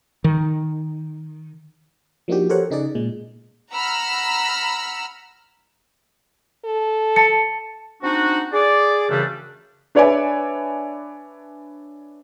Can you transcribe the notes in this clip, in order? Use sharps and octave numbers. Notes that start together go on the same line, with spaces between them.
D#3
F3 A#3 D4 D#4 F#4 G4
G4 A4 A#4 C5 C#5 F#5
C#3 D#4 G#4 D5
A#2 G#3
F#5 A#5 B5 E6 F6
A4
A5 A6 C#7
C4 D4 D#4 F#4
G#4 D5
F#2 C#3 E3 G3 A3 D4
D4 B4 C#5 D5 E5 G#5